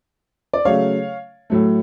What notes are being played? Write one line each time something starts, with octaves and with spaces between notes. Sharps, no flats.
D5
C#3 F#3 A3 C#5 F5
A2 F#3 A3